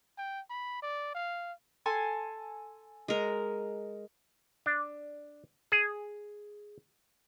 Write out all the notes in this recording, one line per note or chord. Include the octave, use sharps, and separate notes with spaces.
G5
B5
D5
F5
A4 G#5 C6
G#3 A#4
D4
G#4